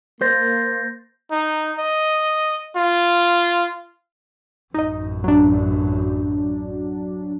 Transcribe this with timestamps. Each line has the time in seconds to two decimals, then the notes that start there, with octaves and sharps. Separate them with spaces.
0.21 A#3 C5 G6 A6 A#6
1.31 D#4
1.78 D#5
2.76 F4
4.74 A1 F#2 D#4 D#5
5.24 F#3 D4